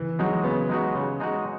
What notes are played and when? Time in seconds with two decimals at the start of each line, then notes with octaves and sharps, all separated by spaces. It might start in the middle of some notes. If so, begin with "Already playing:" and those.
Already playing: E3
0.19 F#3 G#3 D#4 F#4
0.44 C#3 B3
0.69 G#3 D#4 F#4
0.95 C#3
1.20 G#3 D#4 F#4